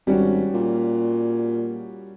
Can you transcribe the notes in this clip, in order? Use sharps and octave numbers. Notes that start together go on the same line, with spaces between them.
G#1 G3 C#4 F#4
A#2